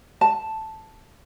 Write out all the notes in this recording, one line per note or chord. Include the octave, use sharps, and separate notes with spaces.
A5